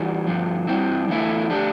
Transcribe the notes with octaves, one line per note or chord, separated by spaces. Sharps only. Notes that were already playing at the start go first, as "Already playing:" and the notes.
Already playing: E2 E3 G3
G2 D3 F3
G2 D3 G3 C4 E4
E2 D3 A3 E4
D3 A3 D4 G4